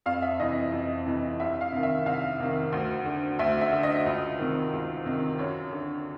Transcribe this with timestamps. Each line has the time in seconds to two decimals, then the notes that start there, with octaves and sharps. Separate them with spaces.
0.06 F2 F5
0.22 E5
0.40 C3 E3 D#5
0.72 F2
1.06 C3 E3
1.40 C2 E5
1.61 F5
1.72 C3 D#3
1.83 E5
2.06 C2 F5
2.40 C3 D#3
2.72 D2
3.05 D3
3.39 D2 E5
3.61 E5
3.72 D3
3.83 D#5
4.06 C#2
4.38 C3 D#3
4.72 C#2
5.06 C3 D#3
5.39 F#2 C#5
5.72 D3